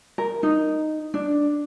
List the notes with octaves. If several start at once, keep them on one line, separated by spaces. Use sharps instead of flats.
A#4
D#4
D4